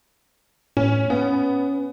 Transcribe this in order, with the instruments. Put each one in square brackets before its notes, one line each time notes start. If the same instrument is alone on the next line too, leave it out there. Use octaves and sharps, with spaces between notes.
[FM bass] A2 [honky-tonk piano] C#4
[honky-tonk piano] B3 [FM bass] C#4